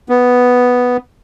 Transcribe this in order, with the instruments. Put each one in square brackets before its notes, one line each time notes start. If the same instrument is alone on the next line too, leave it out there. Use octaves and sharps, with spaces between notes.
[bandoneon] B3